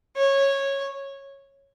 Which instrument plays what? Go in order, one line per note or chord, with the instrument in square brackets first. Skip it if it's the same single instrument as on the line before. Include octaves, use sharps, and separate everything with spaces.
[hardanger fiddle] C#5